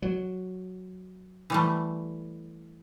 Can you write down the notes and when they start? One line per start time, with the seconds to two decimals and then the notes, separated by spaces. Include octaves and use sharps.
0.02 F#3
1.50 E3 G3 A3